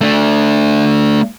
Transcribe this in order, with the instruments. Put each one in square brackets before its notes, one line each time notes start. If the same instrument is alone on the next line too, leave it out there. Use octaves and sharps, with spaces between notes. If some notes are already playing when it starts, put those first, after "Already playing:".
[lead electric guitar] A3 D4